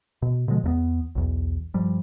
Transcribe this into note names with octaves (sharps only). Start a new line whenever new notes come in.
B2
B2 D3 F3 G#3
E2 A3 B3
B1 E2
G2 F3 G3